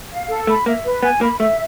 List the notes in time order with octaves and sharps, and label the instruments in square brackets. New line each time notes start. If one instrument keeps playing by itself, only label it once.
[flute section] F5
A4
[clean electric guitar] A3 [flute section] B5
[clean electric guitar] A#3 [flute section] E5
[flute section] B4
[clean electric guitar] B3 [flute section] G#5
[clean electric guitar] A#3 [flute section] B5
[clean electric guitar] A3 [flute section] E5